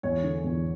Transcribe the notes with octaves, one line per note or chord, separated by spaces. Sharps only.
E2 C#5
D3
E2